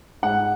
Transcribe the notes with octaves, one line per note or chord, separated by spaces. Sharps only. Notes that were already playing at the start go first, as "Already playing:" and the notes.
G#2 F#5